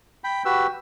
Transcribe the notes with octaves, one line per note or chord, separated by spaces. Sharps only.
G5 B5
F#4 G4 B4 E6